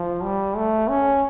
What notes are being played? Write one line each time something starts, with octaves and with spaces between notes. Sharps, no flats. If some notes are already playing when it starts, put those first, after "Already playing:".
Already playing: F3
G3
A3
C#4